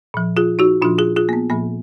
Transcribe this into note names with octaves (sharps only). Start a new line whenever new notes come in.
A#2 F3
F4 G#4
D#4 F#4
A#2 F3 D4 F4
F4 G#4
F4 G#4
A#3
B3
A#2 F3 A#3